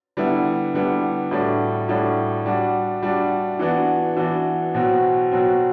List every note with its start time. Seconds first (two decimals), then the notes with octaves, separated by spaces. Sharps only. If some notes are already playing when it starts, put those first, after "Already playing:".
0.17 D3 G3 B3 E4
0.74 D3 G3 B3 E4
1.31 A2 G3 D4 F#4
1.88 A2 G3 D4 F#4
2.46 G3 D4 F#4
3.02 G3 D4 F#4
3.59 E3 B3 D4 F#4
4.17 E3 B3 D4 F#4
4.74 B2 F#3 C4 F#4
5.31 B2 F#3 C4 F#4